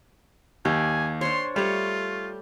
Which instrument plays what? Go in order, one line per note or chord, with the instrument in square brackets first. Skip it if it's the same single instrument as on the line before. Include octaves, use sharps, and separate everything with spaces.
[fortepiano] D#2 [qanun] G4 [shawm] G#5
[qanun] D4 C5 C#5 [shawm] C6
[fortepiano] G3 [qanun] A3 C#5 [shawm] F4